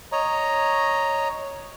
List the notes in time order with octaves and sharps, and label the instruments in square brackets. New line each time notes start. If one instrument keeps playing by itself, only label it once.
[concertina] C#5 D#5 A#5